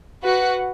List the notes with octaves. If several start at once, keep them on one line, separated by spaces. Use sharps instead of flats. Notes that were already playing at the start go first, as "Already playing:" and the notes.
F#4 B4 F#5